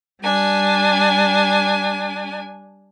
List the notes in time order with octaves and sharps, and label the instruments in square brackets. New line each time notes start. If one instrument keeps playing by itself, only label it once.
[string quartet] G3 D4 G#5